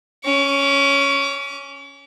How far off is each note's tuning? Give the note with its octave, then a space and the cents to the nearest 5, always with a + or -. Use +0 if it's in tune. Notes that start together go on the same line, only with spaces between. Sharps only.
C#4 +0 D6 -40